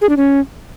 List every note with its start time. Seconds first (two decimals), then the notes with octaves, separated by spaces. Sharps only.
0.01 G#4
0.09 D4
0.17 C#4